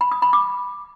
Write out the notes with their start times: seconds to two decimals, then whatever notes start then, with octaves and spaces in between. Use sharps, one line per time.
0.01 B5
0.11 D#6
0.22 B5
0.33 D6